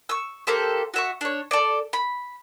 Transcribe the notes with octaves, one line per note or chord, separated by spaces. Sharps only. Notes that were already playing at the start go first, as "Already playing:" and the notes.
C#6 E6
A#3 G4 A4 C5
F#4 E5 C#6
D4 C#5
A4 D5
B5